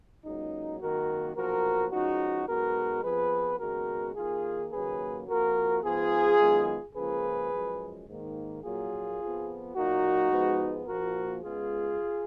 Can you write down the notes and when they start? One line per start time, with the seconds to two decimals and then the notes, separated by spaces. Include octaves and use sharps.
0.24 C#2 C#3 F#3 A#3 D#4
0.80 G#1 F#2 D#3 A#3 F#4 A#4
1.36 B1 A#2 F3 F#4 A#4
1.92 C#2 C#3 F3 D#4 F#4
2.47 B1 B2 G#3 B3 F#4 A#4
3.03 F2 F3 B3 G#4 B4
3.60 D#2 C#3 G#3 B3 F#4 A#4
4.15 D#2 D#3 A#3 F4 G#4
4.71 D#2 C#3 F#3 A#3 G#4 B4
5.27 F2 F3 A#3 F#4 A#4
5.83 G#2 F3 B3 F4 G#4
6.40 F#2 D#3 G#3 B3
6.95 C#2 C#3 F3 A#3 G#4 B4
7.51 F#2 F3 G#3
8.07 G#2 D#3 A#3
8.63 A#1 A#2 F#3 A#3 F4 G#4
9.19 F2 F3 B3
9.75 B1 A#2 F#3 A#3 D#4 F#4
10.31 G#2 F3 G#3 B3
10.86 A#1 A#2 F3 A#3 F#4 A#4
11.43 C#2 C#3 G#3 B3 F4 G#4